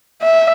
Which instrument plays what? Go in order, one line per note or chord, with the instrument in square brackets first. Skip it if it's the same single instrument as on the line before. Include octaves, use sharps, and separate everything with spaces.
[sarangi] E5